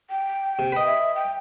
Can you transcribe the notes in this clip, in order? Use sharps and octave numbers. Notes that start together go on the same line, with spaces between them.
G5
C3
B4 D#5
E5
G5